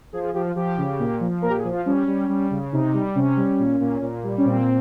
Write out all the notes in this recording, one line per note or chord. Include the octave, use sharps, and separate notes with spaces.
F3 G#4
G#4
F3 G4
F4
F3 G4
C#3
A#2
F3
A#2 A#4
G4
G#4
F3
F4
G3 C#4
G3
G3
C#3
C3 D#4
G3
C3 C#4
G3
A#2
A#2
A#2
G3
C#4
A#2 C4